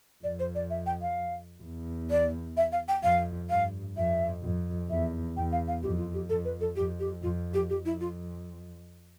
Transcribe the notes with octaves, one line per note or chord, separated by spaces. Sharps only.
F2 D5
C5
D5
E5
G5
F5
E2
D5
E5
F5
G5
F2 F5
G2 F5
F2 E5
F2
E2 E5
E2 G5
F5
F5
F2 G4
F4
G4
F2 A4
B4
A4
F2 G4
G4
F2 F4
G4
F2 G4
E4
F4